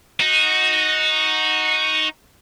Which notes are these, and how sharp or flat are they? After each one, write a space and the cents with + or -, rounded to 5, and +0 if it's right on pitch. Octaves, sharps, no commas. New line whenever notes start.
D#4 +0 F#4 -5